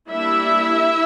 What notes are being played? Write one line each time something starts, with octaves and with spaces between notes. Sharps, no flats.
G3 A#3 D4 E4 E5